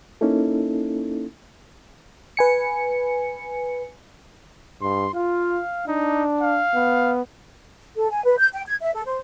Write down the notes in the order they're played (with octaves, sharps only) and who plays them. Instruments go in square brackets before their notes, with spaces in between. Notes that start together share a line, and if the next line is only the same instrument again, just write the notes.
[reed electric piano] A#3 C#4 D#4 E4 A4
[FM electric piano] B4 G#5 C#7
[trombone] G2 [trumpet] C6
[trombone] F4 [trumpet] F5
[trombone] D4 [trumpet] D#4
[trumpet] F5
[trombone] B3
[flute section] A4
G#5
B4
G6
G5
G#6
E5
A4
C5